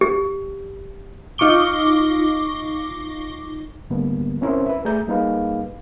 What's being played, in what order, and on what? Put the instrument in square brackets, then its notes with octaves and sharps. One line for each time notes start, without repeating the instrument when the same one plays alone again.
[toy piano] G4
[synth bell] D#4 F4 C#6 D6 G7
[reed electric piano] D2 G#2 D3 G3 A#3 B3
C4 C#4 E4 A#4 C5 E5
B4 E5
A3 G#4 D5 E5 A#5 G6
G3 A#3 D#4 G#4 B4 F5